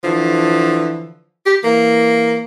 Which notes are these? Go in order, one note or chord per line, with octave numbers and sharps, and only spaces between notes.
D3 E3 F3
G4
E3 A#3